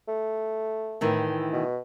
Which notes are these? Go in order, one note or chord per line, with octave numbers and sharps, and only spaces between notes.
A3
A2 D#3 E3
B2